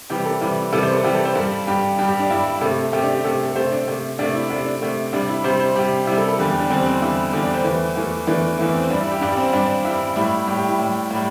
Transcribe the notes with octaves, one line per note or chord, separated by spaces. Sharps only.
C3 E3 G3 G4
A4
C3 E3 G3
C3 E3 G3 A4
C5
A4
C3 E3 G3 G4
A4
C5
G2 G3 A4
G2 G3 G4
G2 G3 G4
G4
D4
G2 G3 E4
C3 A3 A4
C3 A3 G4
D4
G4
C3 A3 A4
A4
C3 A3 C5
D4
C3 A3
C3 A3 D4
E4
C3 A3 D4
D4
C3 A3
C3 G3 D4
E4
C3 G3 C5
C5
C3 G3 G4
C3 G3 E4
A4
A4
E2 D3 G3 G4
G4
D4
E2 D3 G3 C4
C4
E2 D3 G3 E4
E2 D3 G3 G4
D4
C5
E2 E3 A3
E2 E3 A3
E2 E3 A3 D4
E2 E3 A3 E4
C4
G2 G3 D4
E4
G4
G2 G3 D4
C4
G2 G3 D4
G2 G3 E4
A2 G3 E4
A2 G3 G4
G4
E4
A2 G3
A2 G3